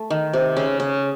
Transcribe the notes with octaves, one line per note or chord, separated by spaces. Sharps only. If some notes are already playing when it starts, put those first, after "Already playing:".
Already playing: A3
D#3
C3
C#3
C#3